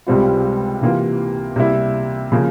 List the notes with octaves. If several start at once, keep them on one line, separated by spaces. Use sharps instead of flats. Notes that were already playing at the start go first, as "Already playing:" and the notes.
C#2 C3 G3 C4 F4
C3 E3 A#3 F4
C3 G3 A#3 E4
C#3 F3 A#3